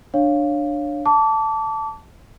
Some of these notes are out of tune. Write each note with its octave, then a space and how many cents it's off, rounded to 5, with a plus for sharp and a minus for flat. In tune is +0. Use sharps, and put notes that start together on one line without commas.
D4 +10 C#5 +0 F5 +0
A5 +0 D6 -30